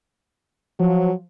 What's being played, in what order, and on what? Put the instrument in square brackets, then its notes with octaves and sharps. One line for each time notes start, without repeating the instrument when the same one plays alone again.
[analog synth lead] F3 [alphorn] F#3